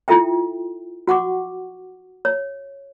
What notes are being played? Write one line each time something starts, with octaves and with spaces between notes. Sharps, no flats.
E4 F4 A4 E5 G5
F#4 F#5 C#6 D6
C#5